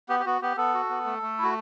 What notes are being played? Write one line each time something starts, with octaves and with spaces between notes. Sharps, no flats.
B3 G4
G4
B3 F#4
B3 G4
B3 A4
F#4
B3
A3
A3
E4 F#4